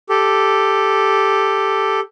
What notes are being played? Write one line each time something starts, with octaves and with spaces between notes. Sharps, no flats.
G4 A4